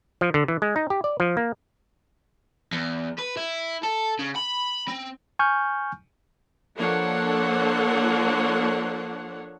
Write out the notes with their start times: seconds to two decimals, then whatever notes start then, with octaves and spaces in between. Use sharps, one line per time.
0.21 F3
0.34 D3
0.48 E3
0.62 G#3
0.76 D#4
0.90 G4
1.04 D5
1.20 F3
1.37 A#3
2.72 E2
3.19 B4
3.37 E4
3.83 A4
4.19 C#3
4.36 B5
4.88 C4
5.39 G#5 C#6 F6 G6
6.77 F3 A#3 D4 A4 C#5 F#5